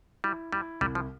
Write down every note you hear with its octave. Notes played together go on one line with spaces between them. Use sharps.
G3 E4
G3 E4
C2 G3
F3